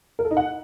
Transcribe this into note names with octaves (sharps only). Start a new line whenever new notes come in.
A#4
A4
D#4
F#5